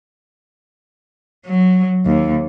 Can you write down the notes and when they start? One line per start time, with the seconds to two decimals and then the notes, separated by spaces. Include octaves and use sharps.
1.47 F#3
2.05 D#2